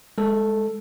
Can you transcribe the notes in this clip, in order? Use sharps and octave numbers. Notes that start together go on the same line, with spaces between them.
G#3 A4